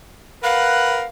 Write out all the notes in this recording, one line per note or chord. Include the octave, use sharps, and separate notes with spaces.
A#4 B4 F5 F#5